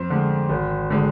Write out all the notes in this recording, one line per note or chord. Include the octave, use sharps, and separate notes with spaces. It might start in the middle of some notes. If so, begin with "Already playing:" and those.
Already playing: F2 C5
D3 G#3
G#1
D3 G#3